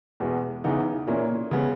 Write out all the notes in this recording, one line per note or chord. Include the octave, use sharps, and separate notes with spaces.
E2 B2 G#3
E2 C#3 E3 B3 D#4
A#2 A#3 C#4 E4
C#3 G#3 B3